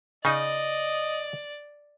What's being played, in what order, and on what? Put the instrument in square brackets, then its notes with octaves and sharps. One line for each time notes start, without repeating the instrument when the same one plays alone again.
[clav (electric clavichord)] C#3 D#4 [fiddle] D5 [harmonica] D#5